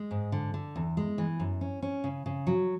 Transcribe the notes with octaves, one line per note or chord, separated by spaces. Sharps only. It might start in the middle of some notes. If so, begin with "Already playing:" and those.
Already playing: G#3
G#2
D3
D3
E2
G#3
E3
F#2
C#4
C#4
C#3
C#3
F#3